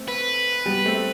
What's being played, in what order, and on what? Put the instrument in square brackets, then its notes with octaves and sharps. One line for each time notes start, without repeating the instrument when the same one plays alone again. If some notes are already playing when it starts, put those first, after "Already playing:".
Already playing: [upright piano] A3 C4
[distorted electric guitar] B4
[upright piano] G3 B3
A3 C4